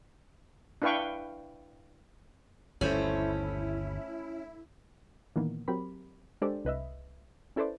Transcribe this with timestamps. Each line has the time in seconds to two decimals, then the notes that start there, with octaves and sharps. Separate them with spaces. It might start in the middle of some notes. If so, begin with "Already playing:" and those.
0.82 D4 E4 B4 F5 G5 C#6
2.81 G1 D#2 A3 C#4 E4 C5 B5
5.36 A#2 D#3 E3 A#3 B3
5.68 F#3 C4 G4 A#4 B5
6.42 G#3 D4 G4 A4 C5 D5
6.65 C2 B4 D#5 E5
7.56 C#4 E4 A4 B4 C5 D5